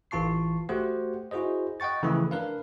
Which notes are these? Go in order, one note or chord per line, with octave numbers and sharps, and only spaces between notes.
A1 E3 F4 A5 C#6 C7
A3 F#4 G4 C5 F#5
E4 F#4 G#4 C5 D#5
D#5 F#5 G5 C#6 A6
C#3 E3 F3 A3 E4 B4
D4 A#4 B4 F5